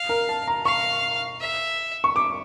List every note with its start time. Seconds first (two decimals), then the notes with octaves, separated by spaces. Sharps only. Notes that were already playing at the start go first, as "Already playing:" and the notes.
Already playing: F5
0.09 A#4
0.29 A5
0.48 A#5
0.65 F5 C#6
1.40 E5
2.04 C#6
2.16 D6